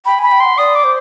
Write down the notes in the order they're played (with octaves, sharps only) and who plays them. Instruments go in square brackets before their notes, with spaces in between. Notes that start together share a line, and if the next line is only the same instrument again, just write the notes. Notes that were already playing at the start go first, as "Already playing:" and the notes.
[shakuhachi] G5 [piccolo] B5
[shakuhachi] G#5 [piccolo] B5
[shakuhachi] G5
[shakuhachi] F#5 [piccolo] C6
[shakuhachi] D5 [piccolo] D#6
[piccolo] D6
[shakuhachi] C5